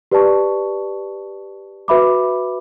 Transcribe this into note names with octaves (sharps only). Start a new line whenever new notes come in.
G4 B4 D5 A5 C#6
F#4 B4 E5 B5 D6